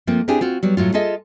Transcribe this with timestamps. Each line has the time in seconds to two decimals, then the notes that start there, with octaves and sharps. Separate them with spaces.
0.07 F3 A3 A#3 C4
0.28 C4 D4 E4 G4 G#4
0.41 C4 F4 F#4
0.63 F#3 G3 B3
0.77 A2 F#3 F4
0.94 F4 G#4 A4 D#5 E5